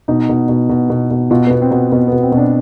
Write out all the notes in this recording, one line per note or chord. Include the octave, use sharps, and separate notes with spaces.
B2 D#4
B2
B2
B2
B2
B2
B2 F4
B3
B2
C4
B2
B2 B3
B3
B2
C4
B2
D4